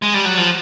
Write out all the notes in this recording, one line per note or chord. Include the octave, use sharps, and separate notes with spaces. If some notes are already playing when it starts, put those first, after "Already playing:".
G#3
G3
F#3
F3